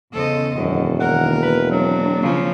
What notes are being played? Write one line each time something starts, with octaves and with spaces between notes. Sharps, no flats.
E2 C#3 A4 C5 D#5
E1 F#2 D#3
D#3 A#3 A#4 F#5
B4
F#3 A#3 C4 D4
C#3 F3